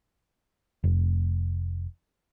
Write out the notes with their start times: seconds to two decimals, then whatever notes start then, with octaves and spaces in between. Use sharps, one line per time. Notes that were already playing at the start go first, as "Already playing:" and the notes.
0.84 F1